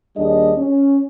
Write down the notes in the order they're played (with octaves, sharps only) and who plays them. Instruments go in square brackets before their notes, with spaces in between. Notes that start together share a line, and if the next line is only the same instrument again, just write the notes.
[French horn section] D#2 G3 D4 G#4 D#5
C#4